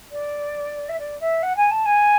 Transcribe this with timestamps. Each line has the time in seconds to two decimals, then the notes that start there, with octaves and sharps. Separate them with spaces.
0.12 D5
0.89 E5
0.99 D5
1.20 E5
1.43 F#5
1.57 G#5
1.71 A5
1.85 G#5